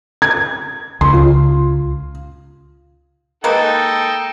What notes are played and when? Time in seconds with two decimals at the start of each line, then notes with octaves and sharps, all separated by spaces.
0.22 G#6
1.01 C#2 C6
1.13 F4
3.44 G#3 A#3 D#4 A4 B4 G5